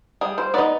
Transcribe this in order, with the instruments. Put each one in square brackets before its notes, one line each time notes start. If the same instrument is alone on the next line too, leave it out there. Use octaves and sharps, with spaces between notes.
[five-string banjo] G3 G#4
C5
B3 D#4 D5